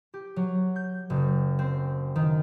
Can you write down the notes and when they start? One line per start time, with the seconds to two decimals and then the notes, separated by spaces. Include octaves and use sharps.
0.14 G4
0.36 F#3
0.76 G6
1.10 F#1
1.59 C4
2.16 D#3